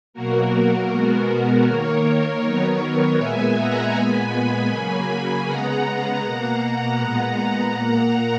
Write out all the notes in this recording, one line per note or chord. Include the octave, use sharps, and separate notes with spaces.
B2 F#3 A#3 F#4 A#4
B2 G#3 B3
D#3 A#3 A#4 C#5
D#3 F#3 B3
A#2 G#3 B3 E5 G#5
F#5 A#5
A#2 G#3 B3 G#5 B5
C#3 F#3 A#3
C#3 G#3 B3 F#5 A#5
B2 A#3
A#2 G#3 B3
A#2 A#3